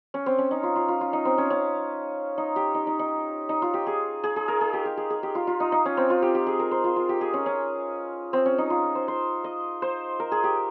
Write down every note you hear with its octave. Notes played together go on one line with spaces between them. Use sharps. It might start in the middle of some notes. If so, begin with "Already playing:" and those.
C#4
C4
C#4
D#4
F4
F4
F4
F4
D#4
C4
C#4
C#4
D#4
G4
D#4
D#4
D#4
D#4
F4
G4
G#4
G#4
G#4
A#4
G#4
G4
G4
G#4
G#4
G4
F4
F4
D#4
D#4
C#4
C4
F4
G4
G4
G#4
A#4
C5
F4
F4
G4
G#4
C#4
C#4
C4
C#4
D#4
F4
C5
C5
D#5
C5
A#4
G#4
G4